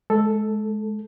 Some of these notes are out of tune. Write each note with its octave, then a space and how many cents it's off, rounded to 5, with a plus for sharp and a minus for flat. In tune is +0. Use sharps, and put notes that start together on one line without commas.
G#3 +30 A4 +0